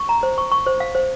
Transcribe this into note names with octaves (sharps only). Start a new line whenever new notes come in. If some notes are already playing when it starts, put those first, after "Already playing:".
Already playing: C#6
A#5
C5
C#6
C#6
C5
F5
C5